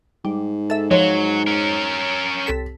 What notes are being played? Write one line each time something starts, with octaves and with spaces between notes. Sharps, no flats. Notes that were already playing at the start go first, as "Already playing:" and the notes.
G#2 G3
A4 E5
F3 F#3 C#5
C#4 A#4
C2 A4 B6